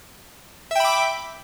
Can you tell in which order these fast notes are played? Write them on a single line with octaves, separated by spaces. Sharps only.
E5 G5 B5 D6